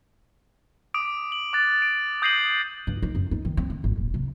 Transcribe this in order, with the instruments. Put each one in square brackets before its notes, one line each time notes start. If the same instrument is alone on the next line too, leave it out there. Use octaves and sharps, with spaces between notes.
[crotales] D6 D#6 D7
F#7
D6 F#6 A6
D7
D#6 G6 A#6 C7 D#7 F#7
[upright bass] G2
D#4
F#2
D#4
D#3
C4
D#3
G#1
D#1
C3